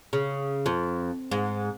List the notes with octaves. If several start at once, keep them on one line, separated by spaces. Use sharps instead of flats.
C#3
F2
G#2